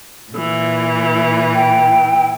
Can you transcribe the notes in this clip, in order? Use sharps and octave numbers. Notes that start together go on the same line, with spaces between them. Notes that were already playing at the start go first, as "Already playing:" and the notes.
A#2 E3
G5